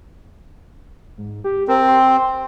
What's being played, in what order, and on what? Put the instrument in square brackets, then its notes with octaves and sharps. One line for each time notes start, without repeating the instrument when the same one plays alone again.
[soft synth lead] G#2
G4
[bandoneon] C4 [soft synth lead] A#4
[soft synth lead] C6